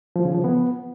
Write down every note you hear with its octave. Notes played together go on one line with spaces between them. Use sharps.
F3
C#3
F3
B3